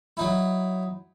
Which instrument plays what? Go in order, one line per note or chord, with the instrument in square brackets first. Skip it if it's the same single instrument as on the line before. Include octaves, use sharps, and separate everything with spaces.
[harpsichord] F#3 D#4 E4